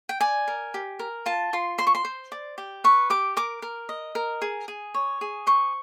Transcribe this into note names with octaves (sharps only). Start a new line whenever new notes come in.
G5
D5 G#5
A#4
G4
A#4
F4 A5
F4 C6
C5 C6
C#6
C6
C5
D5
G4
B4 C#6
G4 D6
A#4 D6
A#4
D#5
A#4
G#4
G#4
C#5
G#4
C5 C#6